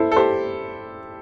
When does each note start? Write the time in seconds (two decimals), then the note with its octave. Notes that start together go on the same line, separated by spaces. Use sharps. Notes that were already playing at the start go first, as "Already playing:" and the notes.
Already playing: E4 A4 C5
0.12 A4
0.16 G4 C5